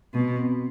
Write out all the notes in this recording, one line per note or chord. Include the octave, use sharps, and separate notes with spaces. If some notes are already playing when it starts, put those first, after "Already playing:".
B2 C4
B3
C4